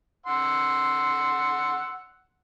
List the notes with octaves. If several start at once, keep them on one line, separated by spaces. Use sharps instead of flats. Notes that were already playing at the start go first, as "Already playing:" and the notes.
F#5 C6 E6